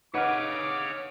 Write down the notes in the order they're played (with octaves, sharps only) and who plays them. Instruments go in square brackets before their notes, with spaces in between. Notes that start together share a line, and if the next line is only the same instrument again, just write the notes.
[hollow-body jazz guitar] D#4 B4 [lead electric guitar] C#5 F5 [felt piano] F#5 [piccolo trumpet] D6